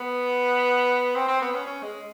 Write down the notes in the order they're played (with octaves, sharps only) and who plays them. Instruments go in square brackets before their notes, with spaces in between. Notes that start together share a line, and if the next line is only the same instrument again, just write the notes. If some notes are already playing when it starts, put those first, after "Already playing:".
Already playing: [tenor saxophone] B3
C4
C4
B3
C#4
C#4
G#3